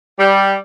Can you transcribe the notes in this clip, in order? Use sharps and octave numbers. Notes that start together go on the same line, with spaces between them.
G3